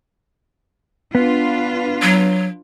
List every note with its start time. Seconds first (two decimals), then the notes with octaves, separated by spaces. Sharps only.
1.15 B3 D4 F4 B4
2.02 F#3